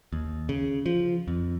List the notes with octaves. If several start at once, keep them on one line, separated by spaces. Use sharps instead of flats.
D#2
C#3
F3
F2